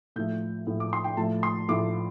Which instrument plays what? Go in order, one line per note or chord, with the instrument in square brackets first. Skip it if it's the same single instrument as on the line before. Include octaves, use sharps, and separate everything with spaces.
[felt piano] A2 F3 A3 G6
A2 F3 A3
D6
C6
G5
A2 F3 A3 A5
C6
A2 F3 A3 D6